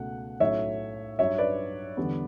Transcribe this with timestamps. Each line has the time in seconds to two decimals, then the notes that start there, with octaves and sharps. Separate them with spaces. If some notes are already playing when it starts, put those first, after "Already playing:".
Already playing: C#2 B2 A3 F#5
0.40 B1 A2 F#3 A3 C#4 C#5 E5
1.19 G2 F#3 C#4 C#5 E5
1.38 B4 D5
1.97 E2 D3 G3 B3